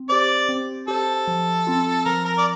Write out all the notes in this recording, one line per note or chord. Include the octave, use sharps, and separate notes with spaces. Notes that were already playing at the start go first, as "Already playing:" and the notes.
Already playing: C4
G4 C5 D5
C4
G4 A4 C5
F3
C4 F4
F3 A#4
A#4
D5